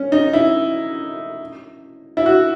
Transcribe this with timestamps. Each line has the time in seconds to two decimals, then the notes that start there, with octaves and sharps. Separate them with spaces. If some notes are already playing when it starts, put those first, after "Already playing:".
Already playing: C#4
0.12 D#4
0.33 E4
2.17 E4
2.26 F#4